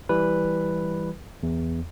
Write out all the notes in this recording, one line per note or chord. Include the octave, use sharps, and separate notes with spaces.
E3 G3 B4
E2